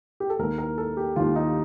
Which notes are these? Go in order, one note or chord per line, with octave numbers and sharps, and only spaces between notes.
G4
A4
D#2 D#3 A#4
A#4
A4
G4
D#2 D#3 F4
D#4